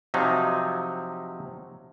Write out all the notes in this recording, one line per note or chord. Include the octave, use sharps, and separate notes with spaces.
C3 F3 F#3 D#4